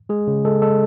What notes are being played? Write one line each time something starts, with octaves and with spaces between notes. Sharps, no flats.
G#3 G#4
C#3
G#3 A4
G#3 A4